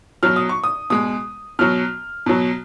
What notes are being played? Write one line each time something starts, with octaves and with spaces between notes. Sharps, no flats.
B2 F#3 F6
D#6
C#6
D#6
B2 G#3 D#6
B2 F#3 F6
B2 F#3